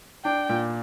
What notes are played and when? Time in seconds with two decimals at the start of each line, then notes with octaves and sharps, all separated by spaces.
0.25 D4 G5
0.49 A#2